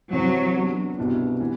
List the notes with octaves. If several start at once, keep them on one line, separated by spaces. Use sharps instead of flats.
C2 C3 E3 F#3 G3 C4
F#3 B3 D4
C2 B2 G3 B3 D4
E3 B3